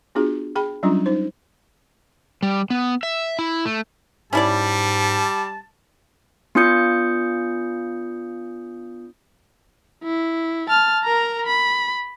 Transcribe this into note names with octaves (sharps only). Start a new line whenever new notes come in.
B3 D4 F4 F#4 G#4
G#4 G5 B5
F#3 G3 C#4 D4 F4
D#4 C5
G3
B3
E5
E4
A3
G#2 G3 C#4 E4 D5 A5
B3 D4 F4 D#6 G6 C#7
E4
A5 F6
A#4 A#5
B5